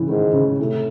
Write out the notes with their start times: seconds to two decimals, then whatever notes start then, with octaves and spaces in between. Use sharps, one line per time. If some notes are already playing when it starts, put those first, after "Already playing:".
Already playing: A2 C#3 E3
0.08 G#2 D#3
0.33 C#3
0.58 A2 C3